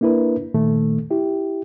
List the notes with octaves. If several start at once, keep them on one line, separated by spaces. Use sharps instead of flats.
A#3 D4 E4 A#4 B4
A#2 D#3 A3
E4 G4